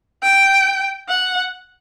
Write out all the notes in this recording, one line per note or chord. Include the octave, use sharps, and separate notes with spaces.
G5
F#5